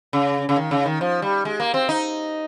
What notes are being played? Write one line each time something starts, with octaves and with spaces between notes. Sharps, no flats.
C#3
C#3
D#3
C#3
D#3
F3
G3
G#3
A#3
C4
D#4